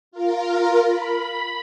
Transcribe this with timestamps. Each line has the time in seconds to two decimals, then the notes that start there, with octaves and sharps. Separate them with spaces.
0.11 F4 A#4
0.84 B5